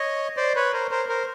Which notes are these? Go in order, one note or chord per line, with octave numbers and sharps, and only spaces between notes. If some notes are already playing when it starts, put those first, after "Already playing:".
Already playing: C#5 D#5
C5 D5
B4 C#5
A#4 C5
A#4 C5
A#4 C5